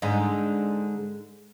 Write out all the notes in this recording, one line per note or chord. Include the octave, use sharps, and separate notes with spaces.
G#2 D3 D#4